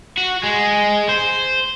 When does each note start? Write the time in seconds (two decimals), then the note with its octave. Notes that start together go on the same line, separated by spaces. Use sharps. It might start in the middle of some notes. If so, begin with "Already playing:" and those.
0.18 F#4
0.44 G#3
1.09 C5